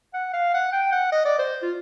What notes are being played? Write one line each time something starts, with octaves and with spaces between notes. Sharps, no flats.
F#5
F5
F#5
G5
F#5
D#5
D5
C5
F4